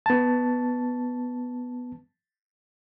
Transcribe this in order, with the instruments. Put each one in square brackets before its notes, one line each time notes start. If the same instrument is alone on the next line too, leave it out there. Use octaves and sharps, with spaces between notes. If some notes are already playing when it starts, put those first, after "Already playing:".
[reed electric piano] B3 A5